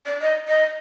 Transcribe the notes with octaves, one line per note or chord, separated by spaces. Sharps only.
D5
D#5
D#5